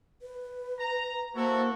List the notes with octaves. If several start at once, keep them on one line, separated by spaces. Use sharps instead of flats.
B4
A#5
A#3 E4 F#4 A4 C5